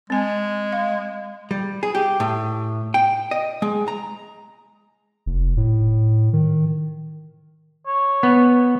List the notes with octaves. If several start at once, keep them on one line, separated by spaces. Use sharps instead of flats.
G#3 C4 G#5
F5
G3
G#4
G4
A2
G5
D#5
G#3
A#5
F1
A2
D#3
C#5
B3